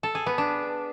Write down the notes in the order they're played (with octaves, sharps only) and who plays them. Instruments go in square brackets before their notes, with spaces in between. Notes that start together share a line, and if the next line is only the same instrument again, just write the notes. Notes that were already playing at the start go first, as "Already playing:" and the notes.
[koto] A4
G#4
B3
D4